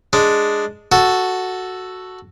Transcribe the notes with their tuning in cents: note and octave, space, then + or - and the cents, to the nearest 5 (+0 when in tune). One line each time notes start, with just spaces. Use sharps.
G#3 +0 D4 +0
F#4 +0 A4 +0